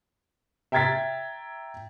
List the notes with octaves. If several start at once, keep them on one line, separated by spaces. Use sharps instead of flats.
E5 G5 A#5 G#6 A6 B6